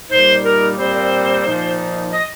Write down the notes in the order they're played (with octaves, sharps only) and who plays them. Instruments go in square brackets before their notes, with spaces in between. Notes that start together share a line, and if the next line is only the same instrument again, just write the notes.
[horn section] A#2 G3 D#4 [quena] C5
[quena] A#4
[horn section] A#2 G3 C4 [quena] C5
[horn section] A#2 F3 D#4
[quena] D#5